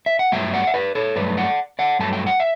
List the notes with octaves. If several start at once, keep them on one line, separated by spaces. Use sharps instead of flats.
E5
F#5
G2 F#3 A3 E5 G5
D5 F#5
E5
B4 D5
A4 C#5
G2 F#3 A3 B4 D5
D5 F#5
D5 F#5
G2 F#3 A3 A5
G5
F#5
E5